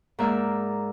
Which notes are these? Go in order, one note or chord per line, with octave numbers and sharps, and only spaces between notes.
G#2 A#3 A#4 D5 E5